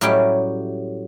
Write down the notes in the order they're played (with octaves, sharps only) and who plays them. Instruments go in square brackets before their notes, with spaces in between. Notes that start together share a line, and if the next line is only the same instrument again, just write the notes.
[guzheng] A2 F#3 G3 C#4 G4 G5